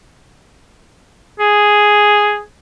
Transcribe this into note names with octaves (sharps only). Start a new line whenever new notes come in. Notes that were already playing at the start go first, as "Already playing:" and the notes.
G#4